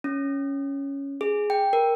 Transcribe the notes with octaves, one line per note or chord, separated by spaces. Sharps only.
C#4
G#4
G5
A#4